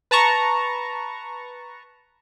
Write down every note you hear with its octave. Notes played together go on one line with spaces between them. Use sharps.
B4 A5 A#5 C#6